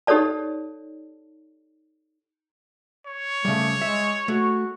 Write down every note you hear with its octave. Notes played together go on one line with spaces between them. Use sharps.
D#4 G4 A4 C#5 D5 A5
C#5
C#3 G3 A3
G#3 E5
A3 F#4